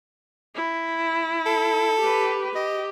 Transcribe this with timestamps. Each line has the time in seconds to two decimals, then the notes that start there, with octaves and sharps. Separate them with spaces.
0.55 E4
1.46 A4
2.00 G4 B4
2.55 G4 D#5